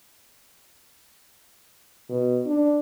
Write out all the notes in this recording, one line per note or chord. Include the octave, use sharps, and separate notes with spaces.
B2
D4